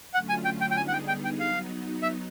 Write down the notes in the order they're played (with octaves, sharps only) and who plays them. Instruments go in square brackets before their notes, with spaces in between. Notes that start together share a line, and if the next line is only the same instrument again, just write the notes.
[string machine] D3 F#3 A3 C#4 F4 [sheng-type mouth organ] F#5
[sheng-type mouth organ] G#5
G5
G5
G5
[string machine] D3 G3 B3 D#4 G#4 [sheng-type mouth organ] G#5
[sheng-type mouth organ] F#5
G5
G5
G5
[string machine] F#3 B3 D#4 [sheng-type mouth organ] F5
[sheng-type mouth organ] E5